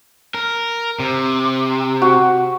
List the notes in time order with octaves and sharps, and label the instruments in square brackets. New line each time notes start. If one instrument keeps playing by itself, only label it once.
[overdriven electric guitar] A#4
C3
[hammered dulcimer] F#4